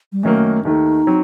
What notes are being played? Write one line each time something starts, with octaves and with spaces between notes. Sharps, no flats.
G3
F#2 D#3 F#3 A3 A#3
D#2 D#3 A3 D#4
F#3 C4